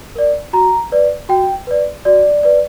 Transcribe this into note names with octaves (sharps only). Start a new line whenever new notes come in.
A#4 D5
F#4 A#5
B4 D5
F#4 G5
B4 D5
F#4 D5
B4 D5